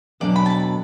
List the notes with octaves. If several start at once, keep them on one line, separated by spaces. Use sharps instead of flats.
E2 B2 F#3 A3 D4 D5
B5
A5